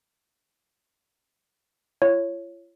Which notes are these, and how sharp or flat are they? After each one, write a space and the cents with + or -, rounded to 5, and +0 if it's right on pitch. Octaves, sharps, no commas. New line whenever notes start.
F4 -40 C#5 +0